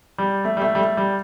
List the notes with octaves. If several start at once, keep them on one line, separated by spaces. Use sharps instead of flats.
G3
A3
G3
A3
G3
A3
G3